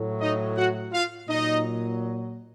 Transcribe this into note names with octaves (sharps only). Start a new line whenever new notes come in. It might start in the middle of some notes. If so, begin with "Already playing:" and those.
Already playing: A2 F#3
D#4 D#5
F#4 F#5
F4 F5
A#2 F#3 D#4 D#5